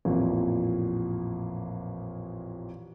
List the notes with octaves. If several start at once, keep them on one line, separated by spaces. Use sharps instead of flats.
A1 F2 A#2